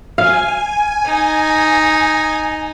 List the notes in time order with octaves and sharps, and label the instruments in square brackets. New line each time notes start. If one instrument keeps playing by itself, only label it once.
[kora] F5 [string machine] G#5
[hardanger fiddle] D#4